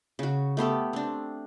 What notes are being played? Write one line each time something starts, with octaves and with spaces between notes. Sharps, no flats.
C#3 F#4
A3 B3 G4 A4
C4 D4